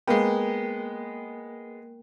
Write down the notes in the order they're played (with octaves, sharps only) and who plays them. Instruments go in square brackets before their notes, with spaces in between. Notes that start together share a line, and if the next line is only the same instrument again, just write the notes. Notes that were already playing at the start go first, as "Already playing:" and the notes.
[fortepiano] G#3 B3 [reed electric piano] A#3 A#4 G5